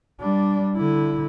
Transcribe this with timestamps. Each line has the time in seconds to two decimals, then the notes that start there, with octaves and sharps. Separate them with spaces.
0.21 G3 D4
0.77 D3 E4